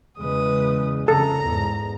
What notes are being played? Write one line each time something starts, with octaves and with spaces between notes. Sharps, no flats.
E2 C#3 G#3 B4 D#6
F2 C#3 A4 A#5
E2 G#2